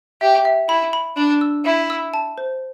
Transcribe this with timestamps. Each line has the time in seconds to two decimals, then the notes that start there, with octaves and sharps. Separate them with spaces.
0.21 G4 E5
0.45 E5
0.69 E4 B5
0.93 B5
1.17 D4 B5
1.41 E6
1.65 E4 E5
1.90 E6
2.14 A5
2.38 C5